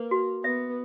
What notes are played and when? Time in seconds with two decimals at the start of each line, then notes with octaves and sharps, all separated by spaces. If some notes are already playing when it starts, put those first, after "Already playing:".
Already playing: A#3 B4
0.11 F#4
0.44 B3 E5